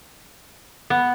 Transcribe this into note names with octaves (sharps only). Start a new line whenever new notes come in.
B3